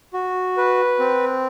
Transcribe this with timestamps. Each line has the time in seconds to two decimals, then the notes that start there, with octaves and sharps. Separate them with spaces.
0.13 F#4
0.57 B4
0.99 C4